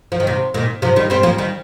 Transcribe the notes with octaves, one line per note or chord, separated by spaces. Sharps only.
F3
D#3
C3
A#2 D#3
C3 F3
D#3 G3
G3 C4
F3 A#3
D#3 G3